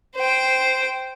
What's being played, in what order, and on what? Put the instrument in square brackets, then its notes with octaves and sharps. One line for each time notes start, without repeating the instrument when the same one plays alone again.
[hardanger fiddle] C5 G5